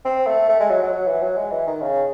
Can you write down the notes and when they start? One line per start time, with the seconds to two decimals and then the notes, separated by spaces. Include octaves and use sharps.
0.05 C4
0.27 A3
0.49 A3
0.60 G#3
0.70 F#3
0.82 F#3
0.92 F#3
1.07 E3
1.22 F#3
1.37 G#3
1.51 E3
1.67 D#3
1.81 C#3